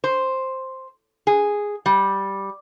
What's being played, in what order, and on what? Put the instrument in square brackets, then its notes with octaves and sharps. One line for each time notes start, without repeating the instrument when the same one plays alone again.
[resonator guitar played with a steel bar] C5
G#4
G3